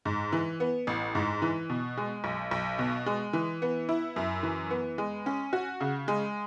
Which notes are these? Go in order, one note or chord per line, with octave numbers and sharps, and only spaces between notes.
G#2
E3
B3
A1
G#2
E3
B2
G#3
B1
B1
B2
G#3
E3
B3
E4
F#2
E3
B3
G#3
C#4
F#4
C#3
G#3